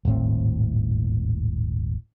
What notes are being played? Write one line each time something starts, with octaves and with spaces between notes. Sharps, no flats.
D#1 G#1 A2 C4